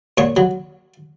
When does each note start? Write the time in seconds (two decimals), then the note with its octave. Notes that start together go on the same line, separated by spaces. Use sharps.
0.18 A#2 C#5
0.37 F#3